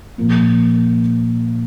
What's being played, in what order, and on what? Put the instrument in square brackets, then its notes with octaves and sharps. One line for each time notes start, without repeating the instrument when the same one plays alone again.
[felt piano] A#2 F3 A#3